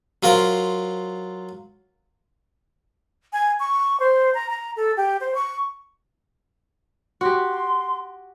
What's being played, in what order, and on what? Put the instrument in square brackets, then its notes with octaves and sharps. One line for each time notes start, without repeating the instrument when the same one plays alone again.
[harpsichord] F#3 F4 A#4 C5
[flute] G#5
C#6
C5
A#5
A#5
A4
G4
C5
C#6
[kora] F#4 G4 [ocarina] C6